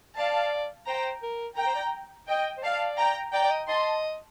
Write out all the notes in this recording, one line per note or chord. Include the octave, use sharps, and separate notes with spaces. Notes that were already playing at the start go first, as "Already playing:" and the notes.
D5 F5 A5
C5 G5 A#5
A#4
A#4 G5 A#5
C5
D5
D#5 G5
C5
D5 F5 A5
G5 A#5
D5 G5 A#5
D5
D#5
D#5 A5 C6